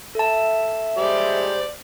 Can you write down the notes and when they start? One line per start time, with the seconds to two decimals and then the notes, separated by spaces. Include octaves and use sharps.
0.15 A4 E5 A5
0.97 G#3 G4 C5 D5